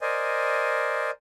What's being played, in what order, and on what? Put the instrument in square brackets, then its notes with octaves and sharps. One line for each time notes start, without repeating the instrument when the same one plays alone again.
[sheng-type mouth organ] A#4 C5 D5 D#5 G#5